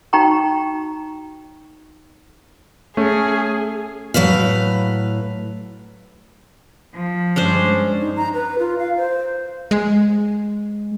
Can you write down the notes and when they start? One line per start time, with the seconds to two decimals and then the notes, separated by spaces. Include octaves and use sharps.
0.13 D#4 F#4 G5 A#5 C#6
2.97 A3 C#4 G#4
4.14 A2 F#3 G#3 B4 F5
6.94 F3
7.36 G2 G#3 C#4 D4 C5
8.01 D#4
8.17 A#5
8.34 B4
8.59 F4
8.79 F5
8.97 C5
9.71 G#3